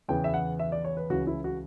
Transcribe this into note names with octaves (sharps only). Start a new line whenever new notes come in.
E2 C#3 E3 B3 G5
E5
F#5
E5
D5
C#5
B4
C#2 C#3 E3 F#4
E4
F#4